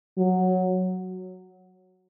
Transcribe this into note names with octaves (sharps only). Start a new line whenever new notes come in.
F#3